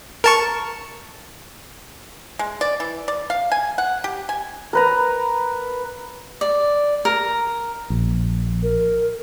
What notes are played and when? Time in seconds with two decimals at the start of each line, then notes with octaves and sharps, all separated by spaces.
0.24 A#4 A5 C#6
2.39 G#3
2.61 D5
2.80 E3
3.08 D5
3.30 F5
3.52 G#5
3.78 F#5
4.04 G4
4.29 G#5
4.73 A#4 B4 A#5
6.41 D5
7.05 A#4
7.90 A#1
8.63 A#4